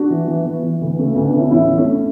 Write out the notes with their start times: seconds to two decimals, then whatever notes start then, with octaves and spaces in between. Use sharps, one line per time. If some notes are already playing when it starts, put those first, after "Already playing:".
Already playing: D4 F#4
0.10 E3
0.28 E3
0.45 E3 B3
0.63 E3
0.81 D2
0.91 B3
0.99 C#3 A3
1.12 B3
1.16 D2
1.24 B3 D4
1.33 D2 C#4 E4
1.51 A1 C#4 E4
1.69 A1
1.78 A3 C#4
1.92 C#4